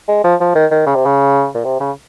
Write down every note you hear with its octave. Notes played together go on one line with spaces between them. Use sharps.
G#3
F3
F3
D#3
D#3
C#3
C3
C#3
A#2
C3
C#3